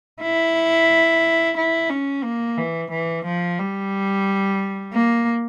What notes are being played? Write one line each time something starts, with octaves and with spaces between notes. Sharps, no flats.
E4
E4
C#4
A#3
E3
E3
F3
G3
A#3